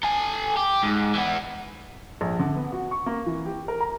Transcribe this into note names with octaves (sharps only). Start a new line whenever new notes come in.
A4 G#5
G4
G#2
E3 B3
A#1
D3
B3
F#4
C#6
A#3
E3
G4
A#4
A#5